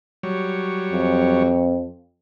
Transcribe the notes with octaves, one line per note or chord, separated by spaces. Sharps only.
F#3 G3 C#5
F2